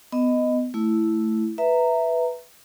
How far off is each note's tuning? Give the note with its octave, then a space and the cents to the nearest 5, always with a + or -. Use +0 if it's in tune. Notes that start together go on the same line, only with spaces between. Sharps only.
B3 +20 D#5 +0
A3 +0 E4 +0
B4 +0 E5 +0 A#5 -15